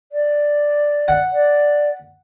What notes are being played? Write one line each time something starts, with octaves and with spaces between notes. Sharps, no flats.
D5
F#5
D5